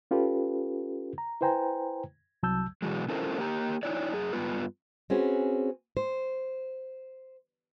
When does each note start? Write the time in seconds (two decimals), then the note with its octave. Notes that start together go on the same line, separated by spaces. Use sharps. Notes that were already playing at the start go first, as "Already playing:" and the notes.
0.11 C#4 F4 G4 A4 B4
1.18 A#5
1.41 E4 B4 C5 G5 G#5 A#5
2.43 C2 F#3 A5 E6 G6
2.82 B2 E3 F#3 G#3
3.08 C#4 E4 F4 A4 A#4 C5
3.39 A#3 G4 A#5
3.83 D#4 E4 C#5 D5
4.13 F#2 G#4
4.32 G2 B3 F4 B4
5.10 C4 C#4 F#4 G#4 B4
5.97 C5